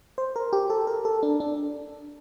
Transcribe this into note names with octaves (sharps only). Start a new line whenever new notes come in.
C5
A#4
G4
A4
A#4
A4
D4
D4